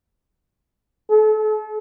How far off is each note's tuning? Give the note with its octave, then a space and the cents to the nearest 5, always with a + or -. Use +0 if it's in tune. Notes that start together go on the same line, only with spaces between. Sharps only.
A4 -35